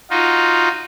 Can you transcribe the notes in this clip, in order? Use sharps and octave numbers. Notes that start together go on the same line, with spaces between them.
D#4 F4 F#4